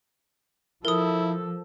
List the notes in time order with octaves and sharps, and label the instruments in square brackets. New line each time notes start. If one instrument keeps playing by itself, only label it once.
[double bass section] F3 [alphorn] E4 [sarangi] A4 [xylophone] A#4 D#6